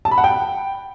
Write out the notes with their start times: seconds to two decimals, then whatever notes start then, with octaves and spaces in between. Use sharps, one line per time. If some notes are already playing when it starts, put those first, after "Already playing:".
0.05 A5
0.11 B5
0.18 F#5
0.24 G5